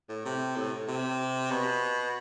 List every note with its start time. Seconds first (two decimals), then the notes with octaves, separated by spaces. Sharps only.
0.09 A2
0.25 C3
0.56 A2
0.87 C3
1.51 B2